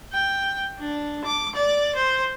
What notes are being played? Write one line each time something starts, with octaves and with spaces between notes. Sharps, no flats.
G5
D4
D6
D5
C5